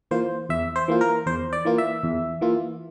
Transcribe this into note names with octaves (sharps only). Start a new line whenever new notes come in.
E3 A#3 F4 C5
E2 E5
C5
E3 A#3 F4
A#4
E2 C5
D5
E3 A#3 F4
E5
E2
E3 A#3 F4